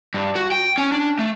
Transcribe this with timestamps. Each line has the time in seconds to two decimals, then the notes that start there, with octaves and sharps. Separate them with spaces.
0.14 G2
0.35 F#4
0.52 G5
0.78 C#4
0.92 D4
1.19 A3